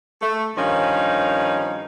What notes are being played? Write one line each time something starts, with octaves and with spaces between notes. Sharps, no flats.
A3
G2 D#3 F3 C#4 F5